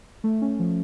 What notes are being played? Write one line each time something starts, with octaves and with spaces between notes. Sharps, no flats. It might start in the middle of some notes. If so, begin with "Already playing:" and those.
A3
C#4
F3